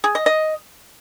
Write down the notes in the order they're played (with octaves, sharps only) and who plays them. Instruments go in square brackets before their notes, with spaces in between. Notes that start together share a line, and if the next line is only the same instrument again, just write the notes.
[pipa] G#4
D#5
D#5